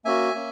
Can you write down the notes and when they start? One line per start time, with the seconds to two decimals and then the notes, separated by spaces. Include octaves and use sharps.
0.05 A#3 C#4 F#4 E5 G#5
0.35 A#3 C#4